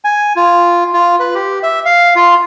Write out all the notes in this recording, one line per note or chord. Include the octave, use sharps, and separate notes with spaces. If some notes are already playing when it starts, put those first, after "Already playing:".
G#5
F4
F4
B4
G4
E5
F5
F4